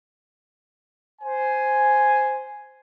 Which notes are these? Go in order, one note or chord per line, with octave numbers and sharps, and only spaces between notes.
C5 G#5